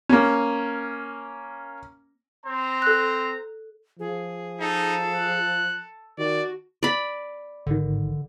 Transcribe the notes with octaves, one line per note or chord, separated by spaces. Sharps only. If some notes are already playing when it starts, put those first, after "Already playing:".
A#3 C#4
C4 C5 A#5
A4 F#6
F3 G#4
D#4 A4
F#6
D#3 F#4 D5
D5 B5
G#1 D3 D#3